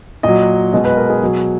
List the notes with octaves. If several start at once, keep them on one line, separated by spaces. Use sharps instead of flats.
A#2 F#3 D#5
B2 G#3 D#5
B4
A#4
G#4
B2 F#3